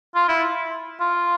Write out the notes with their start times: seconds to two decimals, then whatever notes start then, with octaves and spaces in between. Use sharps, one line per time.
0.15 F4
0.29 E4
1.01 F4